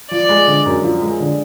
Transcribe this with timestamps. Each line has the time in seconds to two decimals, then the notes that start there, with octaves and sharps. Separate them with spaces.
0.11 F3 D5
0.29 G#3
0.47 D3
0.66 F#2
0.83 F3
1.01 G#3
1.20 D3